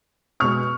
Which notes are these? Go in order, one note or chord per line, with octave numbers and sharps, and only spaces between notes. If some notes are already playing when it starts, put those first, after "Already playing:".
B2 G#3 C#6 F6